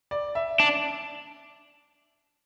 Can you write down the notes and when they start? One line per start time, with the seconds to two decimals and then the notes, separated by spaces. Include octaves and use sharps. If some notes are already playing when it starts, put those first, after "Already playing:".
0.11 D5
0.35 E5
0.60 D4